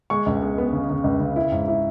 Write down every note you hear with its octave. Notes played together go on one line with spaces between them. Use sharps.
G#3 C#6
C#2
G#3
B3
C#3
C#3
C#2
C#3
E4
G#2
E4